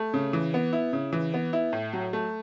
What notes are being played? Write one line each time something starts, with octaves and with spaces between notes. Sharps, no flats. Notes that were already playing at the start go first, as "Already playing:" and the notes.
Already playing: A3
C#3
E3
B3
E4
C#3
E3
B3
E4
A2
F#3
A3